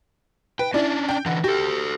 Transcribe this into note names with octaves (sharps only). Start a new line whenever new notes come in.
B4 G5
C#4 D4 E4 D5
G5
D3 E3 F#5
F#4 G4 A4